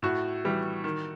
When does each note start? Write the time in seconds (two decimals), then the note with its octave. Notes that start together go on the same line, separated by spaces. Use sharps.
0.02 A2 F#4
0.44 E3 G3
0.84 D#3